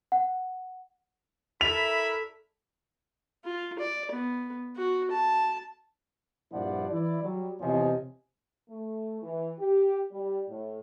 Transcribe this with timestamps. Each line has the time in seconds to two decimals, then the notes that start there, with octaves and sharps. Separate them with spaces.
0.12 F#5
1.61 E4 A4 A#4 D5 E5 B5 F7
3.45 F4
3.79 D5
4.11 B3
4.76 F#4
5.11 A5
6.52 A#1 G2 F3 E4 D5 F#5
6.91 E3 E4 D5
7.23 F#3 G3
7.60 E2 C3 F3 C#5 D#5 G#5
8.70 A3
9.22 E3
9.58 G4
10.12 G3
10.48 A2